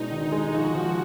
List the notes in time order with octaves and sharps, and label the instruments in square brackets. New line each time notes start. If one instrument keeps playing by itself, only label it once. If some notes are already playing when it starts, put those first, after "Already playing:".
Already playing: [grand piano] B2 G#3 D4 [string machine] D#4
[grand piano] D#3
G#3
[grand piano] F3 [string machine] F#4
[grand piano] F3